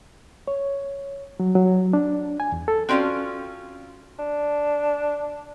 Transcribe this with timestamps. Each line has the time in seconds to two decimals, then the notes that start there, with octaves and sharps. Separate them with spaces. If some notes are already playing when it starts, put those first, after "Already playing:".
0.48 C#5
1.40 F#3
1.55 F#3
1.93 D4
2.40 G#5
2.52 E2
2.68 A4
2.89 C4 C#4 F4 F#4 D5
4.19 D4